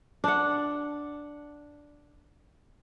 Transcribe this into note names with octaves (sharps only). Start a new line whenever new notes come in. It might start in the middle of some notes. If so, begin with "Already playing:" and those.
D4 F#5